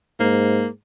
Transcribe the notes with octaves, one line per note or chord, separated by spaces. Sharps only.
G#2 A#3